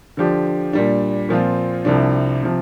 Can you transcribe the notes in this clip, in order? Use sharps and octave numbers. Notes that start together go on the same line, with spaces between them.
D3 F3 D4 G4
A#2 G3 D4
A#2 F3 C4 F4
C2 C3 F3 D4
C3 F3